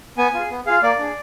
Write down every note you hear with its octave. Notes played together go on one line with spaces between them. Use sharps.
B3 G#5
F4
G#4
B3
F4 G#4 F5
A#3 D5
D4 G#4